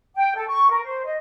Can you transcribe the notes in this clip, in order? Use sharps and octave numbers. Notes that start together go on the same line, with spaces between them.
G5
A4
C#6
A#4
C5
D#5